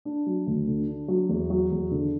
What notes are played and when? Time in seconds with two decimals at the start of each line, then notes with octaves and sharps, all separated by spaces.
0.05 D4
0.26 F#3
0.46 D2
0.67 D3
0.88 D4
1.08 F#3
1.29 E2
1.50 F#3
1.71 E2
1.91 D3